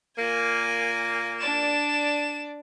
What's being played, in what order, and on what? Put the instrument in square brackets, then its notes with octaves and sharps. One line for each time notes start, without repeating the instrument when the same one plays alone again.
[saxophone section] A#2 A#3 [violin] G#5
[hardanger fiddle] D4 D5 [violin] E7